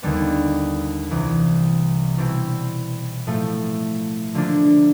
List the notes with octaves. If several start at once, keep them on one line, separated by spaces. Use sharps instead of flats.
D#2 D3 G3 B3
C2 C3 E3
B2 G3 C4 E4
A2 F3 A3
D3 F3 A#3 D4